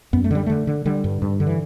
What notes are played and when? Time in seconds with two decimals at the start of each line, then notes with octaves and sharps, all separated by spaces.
0.13 F#2 B3
0.24 A3
0.31 D3 G3
0.46 D3 A3
0.67 D3
0.86 D3 G3
1.04 G2
1.22 G2
1.40 D3
1.47 E3